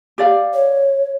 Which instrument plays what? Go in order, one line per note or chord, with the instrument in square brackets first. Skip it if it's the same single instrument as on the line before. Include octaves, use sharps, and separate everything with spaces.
[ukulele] G4 D5 F5
[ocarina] C#5